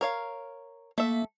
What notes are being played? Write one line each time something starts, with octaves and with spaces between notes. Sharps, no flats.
A#4 C#5 F5
A3 A#3 E5